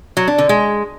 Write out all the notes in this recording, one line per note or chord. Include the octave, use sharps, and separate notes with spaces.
F#3
D4
D3
G#3